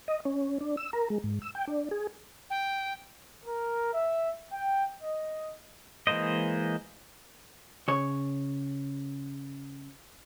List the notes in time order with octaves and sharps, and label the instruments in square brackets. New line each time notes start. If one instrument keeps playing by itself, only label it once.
[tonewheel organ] D#5
C#4
D4
E6
A#4
G#3
G#2
E6
G5
D4
G#4
[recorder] G5
[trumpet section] A#4
E5
G5
D#5
[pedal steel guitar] E3 G#3 A#3 C5 D#5
[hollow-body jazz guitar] C#3 C#5